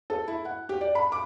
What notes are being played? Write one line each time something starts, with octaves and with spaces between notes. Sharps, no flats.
A4
E4
F#5
G4
D5
B5
D6